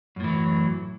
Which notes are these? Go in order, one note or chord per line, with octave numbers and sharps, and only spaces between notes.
F#2 A2 E3 F#3